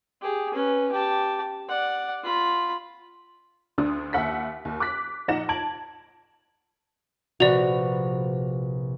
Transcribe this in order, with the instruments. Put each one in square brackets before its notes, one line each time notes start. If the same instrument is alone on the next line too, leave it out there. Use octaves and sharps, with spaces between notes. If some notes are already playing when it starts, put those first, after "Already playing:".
[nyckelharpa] G4 G#4
C#4 B4
G4 A5
D5 F#5
F4 B5
[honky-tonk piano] D2 D3 D4 D#6
D#2 E5 F#5 B6
D#2
D6 F#6 B6
A#1 D#4 F#5 A#6 E7
A5 G#6 D7 F#7
[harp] A#1 C3 B4 [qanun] F#4 [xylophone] D5 F7